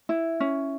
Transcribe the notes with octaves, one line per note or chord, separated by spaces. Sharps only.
E4
C#4